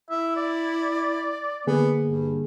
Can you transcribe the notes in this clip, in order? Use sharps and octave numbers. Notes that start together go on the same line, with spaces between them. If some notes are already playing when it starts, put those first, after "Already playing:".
E4 E5
D5
D3 A#3 B3 G#4
G2